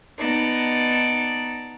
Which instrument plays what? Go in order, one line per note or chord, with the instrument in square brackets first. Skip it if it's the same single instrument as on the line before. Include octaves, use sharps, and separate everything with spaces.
[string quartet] B3 D#4 D5 A5 A#5